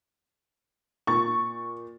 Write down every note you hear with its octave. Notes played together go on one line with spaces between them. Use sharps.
A#2 C#6 A6